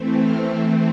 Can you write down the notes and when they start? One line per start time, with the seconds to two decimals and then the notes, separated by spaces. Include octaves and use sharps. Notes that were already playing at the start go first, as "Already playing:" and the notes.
Already playing: E3 A3 C4
0.20 F6